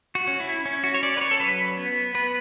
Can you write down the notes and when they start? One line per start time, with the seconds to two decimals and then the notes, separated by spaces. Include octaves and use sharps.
0.15 F#4
0.27 C#4
0.40 E4
0.65 C#4
0.84 F#4
0.94 C#5
1.02 C#4 D5
1.17 B4
1.21 C#5
1.31 A4
1.40 F#3 B4
1.77 B3
2.15 B3 B4